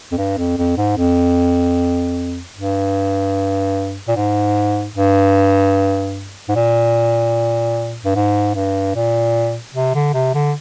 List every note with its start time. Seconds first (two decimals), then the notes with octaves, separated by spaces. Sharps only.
0.12 F2
0.18 G2
0.37 F2
0.57 F2
0.77 G#2
0.97 F2
2.57 G2
4.08 A#2
4.16 G#2
4.96 G2
6.49 G#2
6.56 A#2
8.04 G2
8.15 G#2
8.55 G2
8.95 A#2
9.75 C3
9.95 D3
10.14 C3
10.35 D3